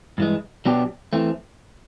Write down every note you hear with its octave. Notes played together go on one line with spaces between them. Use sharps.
G2 E3 G#3
B2 F#3 B3 D4 G4
E3 A3 C4